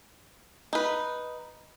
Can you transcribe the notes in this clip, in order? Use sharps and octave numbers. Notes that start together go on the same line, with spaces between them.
D#4 B4